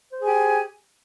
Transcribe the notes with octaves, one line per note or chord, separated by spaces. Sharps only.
G4 G#4 C5 G#5